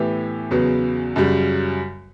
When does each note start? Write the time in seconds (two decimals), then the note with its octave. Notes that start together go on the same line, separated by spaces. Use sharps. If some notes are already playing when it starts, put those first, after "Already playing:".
Already playing: A2 E3 B3 E4 G4
0.51 E2 C#3 F#3 B3
1.16 F#2 C#3 G3